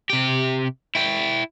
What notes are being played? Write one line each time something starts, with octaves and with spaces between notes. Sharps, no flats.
C3 G4
E4 G5